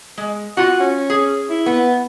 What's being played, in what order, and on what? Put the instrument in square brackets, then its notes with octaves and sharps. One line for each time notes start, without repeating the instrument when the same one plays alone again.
[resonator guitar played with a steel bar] G#3
[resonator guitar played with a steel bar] F4 F#4 [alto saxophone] F#5
[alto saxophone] C#4
[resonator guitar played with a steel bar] G#4
[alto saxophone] E4
[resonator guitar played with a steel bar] B3